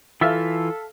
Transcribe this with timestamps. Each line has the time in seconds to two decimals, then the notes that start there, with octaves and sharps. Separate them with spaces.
0.21 E3 F4 A4 E5 F5